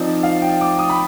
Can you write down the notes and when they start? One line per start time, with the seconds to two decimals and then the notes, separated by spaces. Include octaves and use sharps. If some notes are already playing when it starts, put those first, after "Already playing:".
Already playing: F3 C4 D#4 D5
0.23 F5
0.42 G5
0.61 D6
0.79 D#6
0.90 B5